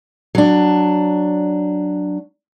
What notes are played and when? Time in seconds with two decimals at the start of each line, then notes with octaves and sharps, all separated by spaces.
0.35 F#3 D4